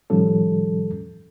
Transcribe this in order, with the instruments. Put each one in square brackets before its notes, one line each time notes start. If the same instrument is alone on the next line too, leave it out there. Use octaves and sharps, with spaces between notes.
[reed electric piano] A2 D#3 F3 G3 C#4 A4